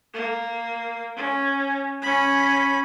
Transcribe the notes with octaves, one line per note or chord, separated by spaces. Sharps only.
A#3
C#4
C#4 B5